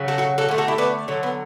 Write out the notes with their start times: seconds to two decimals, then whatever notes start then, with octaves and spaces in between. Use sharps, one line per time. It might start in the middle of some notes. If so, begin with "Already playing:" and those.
Already playing: C#3 F#3
0.08 F#4 A4
0.18 F#4 A4
0.38 F#4 A4
0.48 D3 A3
0.58 F#4 A4
0.68 E4 G4
0.78 B3 D4
1.08 D3 F#3 A3
1.23 B3